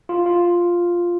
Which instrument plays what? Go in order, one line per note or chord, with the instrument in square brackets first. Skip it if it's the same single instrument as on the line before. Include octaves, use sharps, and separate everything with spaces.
[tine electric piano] F4
F4